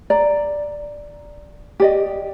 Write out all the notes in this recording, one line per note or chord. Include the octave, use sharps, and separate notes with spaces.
D5 A#5
G4 D5 D#5